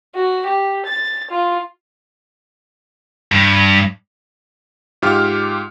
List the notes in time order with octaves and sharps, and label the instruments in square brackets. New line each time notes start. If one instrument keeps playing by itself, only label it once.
[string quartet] F#4
G4
A6
F4
[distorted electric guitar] G2
[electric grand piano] G#2 F4 G4 F6